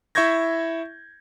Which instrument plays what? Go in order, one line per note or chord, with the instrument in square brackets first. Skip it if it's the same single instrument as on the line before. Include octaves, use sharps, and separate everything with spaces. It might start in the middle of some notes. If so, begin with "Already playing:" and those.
[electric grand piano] E4 E5 C#6 G6 G#6 A#6